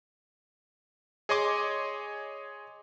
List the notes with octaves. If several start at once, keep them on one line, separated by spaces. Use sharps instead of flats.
G#4 C#5 D#5 G#5 C6 D6